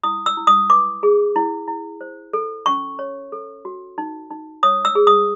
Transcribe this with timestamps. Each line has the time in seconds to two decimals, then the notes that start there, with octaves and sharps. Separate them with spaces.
0.04 E4 D#6
0.26 E6
0.37 E4
0.47 D#6
0.70 B4 D6
1.03 G#4
1.36 E4
1.68 E4
2.01 C5
2.33 A4
2.66 C#4 C#6
2.99 C#5
3.32 A4
3.65 F#4
3.98 D#4
4.30 D#4
4.63 C#5 D#6
4.85 E6
4.95 G#4
5.07 D#6